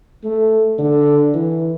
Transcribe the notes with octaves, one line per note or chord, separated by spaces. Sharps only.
A3
D3
E3